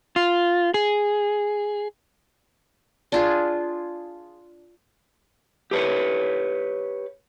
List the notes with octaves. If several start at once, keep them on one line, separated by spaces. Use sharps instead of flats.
F4
G#4
D4 F4 G#4
G4 B4 C#5